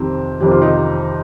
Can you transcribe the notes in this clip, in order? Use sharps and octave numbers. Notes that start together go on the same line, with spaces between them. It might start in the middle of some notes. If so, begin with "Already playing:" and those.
Already playing: F2 C3 D#3 G3 C4
F2 C3 D#3 G3 G4
F4
D#4 G4